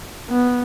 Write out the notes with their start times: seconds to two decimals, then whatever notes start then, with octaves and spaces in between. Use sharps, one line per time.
0.31 B3